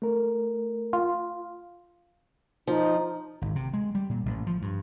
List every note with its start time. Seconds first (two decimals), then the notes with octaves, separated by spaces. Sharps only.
0.02 A3 A#4
0.93 F4
2.67 F3 D#4
3.42 G#1
3.55 C3
3.74 G#3
3.95 G3
4.10 A#2
4.26 A1
4.47 F3
4.62 G2